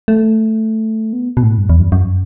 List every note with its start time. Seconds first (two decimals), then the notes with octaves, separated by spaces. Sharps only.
0.08 A3
1.13 B3
1.37 B2
1.43 A2
1.58 G2
1.69 E2
1.80 F#2
1.92 F#2